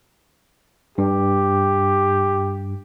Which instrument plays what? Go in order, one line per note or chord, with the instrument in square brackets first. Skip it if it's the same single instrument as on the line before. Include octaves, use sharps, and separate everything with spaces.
[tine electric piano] G2 [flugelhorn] G4